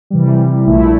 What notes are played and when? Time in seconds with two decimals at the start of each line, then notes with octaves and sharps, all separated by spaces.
0.10 C3 E3 G3
0.66 A#1 A#2 A3 E4